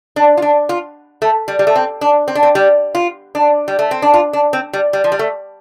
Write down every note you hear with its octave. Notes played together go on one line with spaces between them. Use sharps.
D4
F4
D4
F4
A3
G3
G3
A3
C4
D4
C4
D4
C4
G3
F4
D4
G3
A3
C4
D4
F4
D4
C4
G3
G3
F3
G3
A3